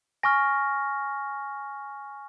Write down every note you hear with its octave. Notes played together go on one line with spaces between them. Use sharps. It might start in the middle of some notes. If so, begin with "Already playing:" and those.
G#5 C#6 F6 A#6